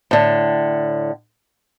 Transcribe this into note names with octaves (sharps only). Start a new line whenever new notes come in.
A2 D3